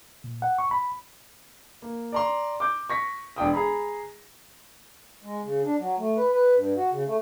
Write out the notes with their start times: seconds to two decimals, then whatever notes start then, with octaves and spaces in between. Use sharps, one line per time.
0.24 A#2
0.42 F#5
0.58 C#6
0.71 B5
1.82 A#3
2.12 D5 A#5 C6
2.60 D6 G6
2.90 C#6 A#6 B6
3.36 E1 D4 G5 D#6
3.52 G#4 A#5 B5
5.23 G#3
5.44 C#3
5.64 D4
5.79 F#3
5.98 A3
6.17 B4
6.32 B4
6.55 G2
6.76 F#4
6.91 C#3
7.06 A3